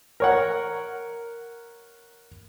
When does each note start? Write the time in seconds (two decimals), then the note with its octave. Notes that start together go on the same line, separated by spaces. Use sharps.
0.20 A#4 C#5 F#5